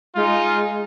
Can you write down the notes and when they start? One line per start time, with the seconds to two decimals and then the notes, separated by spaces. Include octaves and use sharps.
0.15 G#3 D#4 F4